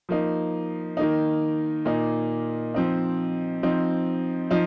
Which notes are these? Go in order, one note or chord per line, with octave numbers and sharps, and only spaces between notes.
F3 A#3 D#4
D#3 A#3 D#4
A#2 A#3 D#4
F3 C4 D#4
F3 C4 D#4
F3 D#4